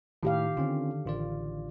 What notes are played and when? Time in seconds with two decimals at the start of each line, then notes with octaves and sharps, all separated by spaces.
0.23 A2 D#3 G4 F5
0.57 D3 C4 C#4 F4
1.06 A1 F4 D5